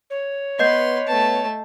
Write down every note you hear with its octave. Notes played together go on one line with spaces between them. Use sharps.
C#5
B3 B4 D#5 C6 G6 C7
A3 B3 A5